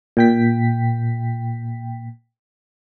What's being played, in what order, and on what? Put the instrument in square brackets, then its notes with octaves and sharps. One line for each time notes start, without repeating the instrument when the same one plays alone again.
[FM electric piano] A#2 G5 B6